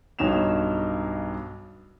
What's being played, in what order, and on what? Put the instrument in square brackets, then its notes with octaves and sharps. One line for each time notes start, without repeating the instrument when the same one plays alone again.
[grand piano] B1 G2 D#4 C#5 E7 F7